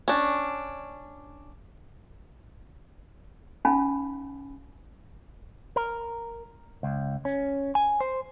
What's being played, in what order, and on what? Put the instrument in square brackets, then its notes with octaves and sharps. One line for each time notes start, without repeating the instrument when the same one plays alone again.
[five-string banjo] C#4 D4
[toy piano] C#4 D#4 F5 G#5 A5 B5
[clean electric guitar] A#4
C#2
C#4
G#5
C5